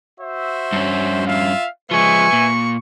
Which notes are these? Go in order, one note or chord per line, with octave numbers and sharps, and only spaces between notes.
F#4 C5 E5
G2 C#4
F4 E5 F5
F3 G#3 B4 E5 G#5 C#6
A#2